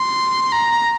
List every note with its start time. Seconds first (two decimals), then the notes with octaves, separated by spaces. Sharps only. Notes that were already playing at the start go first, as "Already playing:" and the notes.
Already playing: C6
0.52 A#5